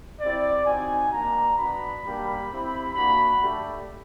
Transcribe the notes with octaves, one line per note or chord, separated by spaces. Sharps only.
C4 E4 G4 D5
C4 D#4 F#4 G#5
A#3 D4 F#4 A#5
B3 D4 F#4 B5
G3 A#3 D4 G4
C4 E4 G4
A#3 D4 F#4 B5
A3 D4 G4